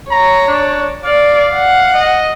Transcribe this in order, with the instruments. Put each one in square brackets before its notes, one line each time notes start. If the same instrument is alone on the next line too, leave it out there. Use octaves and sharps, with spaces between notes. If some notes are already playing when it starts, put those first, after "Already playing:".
[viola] C#5 [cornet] A#5
[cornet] D4
[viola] D5 [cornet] F5
[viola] F#5
[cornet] D#5